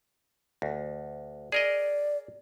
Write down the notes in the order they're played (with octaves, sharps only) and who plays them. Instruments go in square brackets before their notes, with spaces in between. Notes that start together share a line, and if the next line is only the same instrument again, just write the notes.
[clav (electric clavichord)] D2
[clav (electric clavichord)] G#4 A#4 D#5 [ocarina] D5